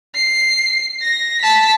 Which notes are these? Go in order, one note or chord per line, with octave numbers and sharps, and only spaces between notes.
C7
A#6
A5 B6